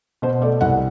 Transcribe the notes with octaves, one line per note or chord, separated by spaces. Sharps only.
B2 C5
A3 D5
C2 F#5